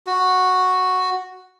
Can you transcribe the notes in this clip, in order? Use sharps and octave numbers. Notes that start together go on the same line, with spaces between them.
F#4